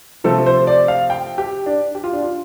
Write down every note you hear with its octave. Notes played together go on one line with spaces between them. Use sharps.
C3 F3 A3 C4 A4
C5
D5
F5
G5
G4
D4
G4
F4
D4
F4